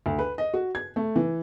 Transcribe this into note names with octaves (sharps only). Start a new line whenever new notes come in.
D2
B4
D#5
F#4
G#6
A3
E3